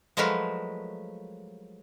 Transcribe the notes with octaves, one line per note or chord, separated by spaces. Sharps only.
F3 F#3 G#3 A3 A#4 B4